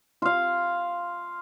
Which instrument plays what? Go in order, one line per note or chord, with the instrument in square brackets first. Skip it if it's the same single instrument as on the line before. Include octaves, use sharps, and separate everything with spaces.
[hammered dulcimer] F4 F5